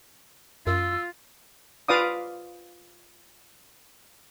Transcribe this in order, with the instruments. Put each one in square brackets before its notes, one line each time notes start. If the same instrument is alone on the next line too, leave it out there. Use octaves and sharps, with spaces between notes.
[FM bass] F#2 [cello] F4 [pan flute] E6
[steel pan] F4 B4 D5 F5 D6 D#6